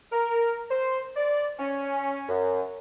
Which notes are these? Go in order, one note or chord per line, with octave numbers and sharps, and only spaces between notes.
A#4
C5
D5
C#4
F#2